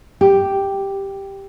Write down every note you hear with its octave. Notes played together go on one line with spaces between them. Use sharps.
G4